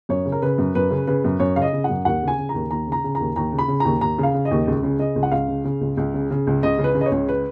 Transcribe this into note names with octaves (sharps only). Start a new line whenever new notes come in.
F#2 C#5
C#3
A#4
C#3 B4
F#2
F#2 B4
C#3
C#3 B4
F#2
F#2 C#5
C#3 F5
D#5
C#3
F#5
F#2
D#2 F#5
C#3
G#5
C#3
A#5
D#2
D#2 A#5
C#3 A#5
C#3
A#5
D#2
D#2 A#5
C#3
B5
C#3
D#2 A#5
D#2 A#5
C#3 F5
C#3
D#5
D#2
C#2
C#3
C#3 D#5
C#2
F#5
C#2 F5
C#3
C#3
C#2
C#2
C#3
C#3
C#2
C#2 D#5
C#3
B4
C#3
D#5
C#5
C#2
B4